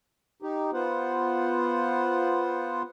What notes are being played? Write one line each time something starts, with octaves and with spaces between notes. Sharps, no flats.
D#4 G4
B3 F4 C5 F#5